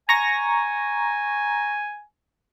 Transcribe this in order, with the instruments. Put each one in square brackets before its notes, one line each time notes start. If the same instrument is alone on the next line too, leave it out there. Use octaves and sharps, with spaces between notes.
[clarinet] G#5 [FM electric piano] A#5 C#6 A#6